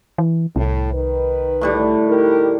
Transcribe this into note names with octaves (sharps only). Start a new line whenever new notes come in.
E3
C2 A2
D#3 B4
A2 D3 G3
D#4 G4 A#4